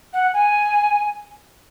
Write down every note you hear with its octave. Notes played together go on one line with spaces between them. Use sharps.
F#5
G#5